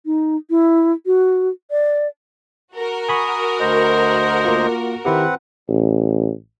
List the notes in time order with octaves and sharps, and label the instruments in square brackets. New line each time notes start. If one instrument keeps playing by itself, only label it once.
[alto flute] D#4
E4
F#4
D5
[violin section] F#4 A#4
[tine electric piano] G#5 B5 C#6 [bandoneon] D#6
[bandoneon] D2 C5 D#5
[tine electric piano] A#3 F4
[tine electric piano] D#3 E4 G4 [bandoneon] C4 B4 F#5
[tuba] A1